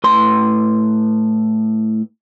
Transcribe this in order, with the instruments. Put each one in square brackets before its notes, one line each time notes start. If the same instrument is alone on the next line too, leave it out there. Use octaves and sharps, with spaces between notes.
[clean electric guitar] A2 B4 C6